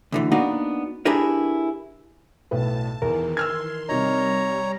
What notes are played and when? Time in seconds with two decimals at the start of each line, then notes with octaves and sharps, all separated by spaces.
0.12 D2 D3 E3
0.31 A#3 B3 D4 D#4 F#4
1.05 D4 E4 G4 G#4 A#4 B4
2.51 B1 A2 B4 A5
3.02 E2 D#3 E3 A#4
3.37 C6 E6 F6 G#6
3.89 C3 G3 D#4 C#5 A#5